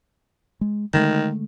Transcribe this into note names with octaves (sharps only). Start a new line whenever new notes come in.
G#3
D3 D#3 G#3 A3